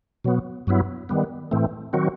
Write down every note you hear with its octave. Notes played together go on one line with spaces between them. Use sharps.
B2 F#3 B3
G2 F#3 B3 E4
D#3 G3 B3
A2 E3 A3 C4
D#3 F#3 C4 F#4